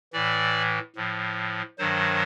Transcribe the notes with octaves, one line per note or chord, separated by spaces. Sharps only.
A2 E3 D5
A2 F3
G2 D#3 F#3 C5